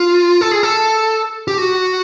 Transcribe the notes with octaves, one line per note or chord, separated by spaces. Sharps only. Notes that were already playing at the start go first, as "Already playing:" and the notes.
Already playing: F4
A4
G#4
A4
G4
F#4